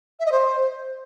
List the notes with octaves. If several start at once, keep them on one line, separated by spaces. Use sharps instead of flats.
E5
D#5
C5